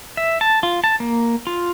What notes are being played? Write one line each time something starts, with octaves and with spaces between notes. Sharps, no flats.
E5
A5
F4
A5
A#3
F4